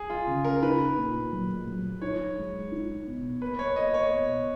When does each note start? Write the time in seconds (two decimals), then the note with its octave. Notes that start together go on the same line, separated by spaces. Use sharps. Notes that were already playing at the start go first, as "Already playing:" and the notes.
Already playing: G#4
0.10 F4
0.27 C#3
0.44 A#4
0.62 D#4 B4
0.97 A#2
1.32 F#3
1.67 F#3
2.02 D#4 C#5
2.37 G#3
2.72 D#4
3.07 B2
3.41 A#3 B4
3.59 C#5
3.76 A#3 D#5
3.94 C#5
4.11 B2